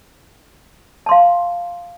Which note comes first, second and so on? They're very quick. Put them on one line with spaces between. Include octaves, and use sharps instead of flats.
A5 C6 F5